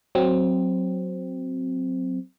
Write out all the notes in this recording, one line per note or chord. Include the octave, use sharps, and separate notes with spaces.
F#3 C4